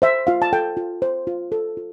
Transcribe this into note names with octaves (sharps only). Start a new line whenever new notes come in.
C5 E5
F4 F5
A5
A4 G5
F4
C5
F4
A4
F4